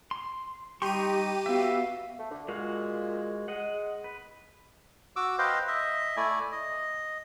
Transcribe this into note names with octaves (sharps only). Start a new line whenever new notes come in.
C6
G3 D#4 G4 C6 C#6 D#7
B3 F#4 E5 F5
A3
D3
A#2 G#3 F#4 F5
G#3 D#5 F#5
B4
F#4 D6 E6
B4 C5 D#5 F5 G5
D#5 E5
A3 E4 D5 G#5
D#5